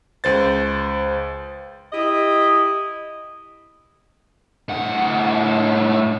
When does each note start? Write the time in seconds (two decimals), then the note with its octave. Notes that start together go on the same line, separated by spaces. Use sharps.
0.24 C#2 C5 A6
1.92 E4 G4 D#5
4.69 A2 F#5